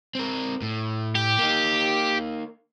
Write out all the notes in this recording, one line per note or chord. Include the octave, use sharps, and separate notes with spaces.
C4 A#4
A2
G4
A#3 D#4